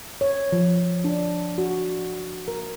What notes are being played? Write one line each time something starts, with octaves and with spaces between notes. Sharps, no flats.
C#5
F3
D4
F#4
A#4